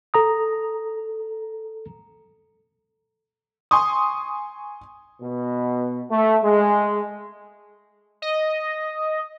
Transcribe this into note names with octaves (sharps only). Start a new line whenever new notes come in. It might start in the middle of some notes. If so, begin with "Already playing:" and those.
A4 A#5 D#6
G#5 C6 C#6 D#6
B2
A3
G#3
D#5